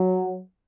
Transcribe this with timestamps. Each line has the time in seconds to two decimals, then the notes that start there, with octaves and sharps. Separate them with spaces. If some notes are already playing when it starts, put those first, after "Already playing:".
Already playing: F#3